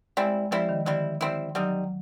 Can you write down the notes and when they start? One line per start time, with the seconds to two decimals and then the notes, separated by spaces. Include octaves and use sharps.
0.17 G3 G#3 C4 E4
0.51 F3 G3 C4 E4
0.69 D#3
0.86 D3 G3 C4 E4
1.21 G3 C4 E4
1.55 F#3 G3 C4 D#4